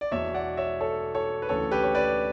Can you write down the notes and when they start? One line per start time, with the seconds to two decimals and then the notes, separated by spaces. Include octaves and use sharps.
0.01 D5
0.11 E1 E2 B2 C#5 E5
0.34 D5 F#5
0.57 C#5 E5
0.81 A4 C#5
1.15 A4 C#5
1.42 B4
1.49 D2 C#3 E3 A4 C#5
1.71 G4 B4
1.83 C#5
1.95 B4 D5